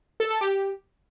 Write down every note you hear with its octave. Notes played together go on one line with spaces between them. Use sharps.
A4
A4
G4